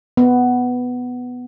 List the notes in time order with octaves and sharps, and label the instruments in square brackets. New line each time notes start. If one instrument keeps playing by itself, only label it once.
[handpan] B3